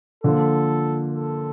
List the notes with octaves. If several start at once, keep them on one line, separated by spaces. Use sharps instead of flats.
D3 F3 A#3 F4 A4
A4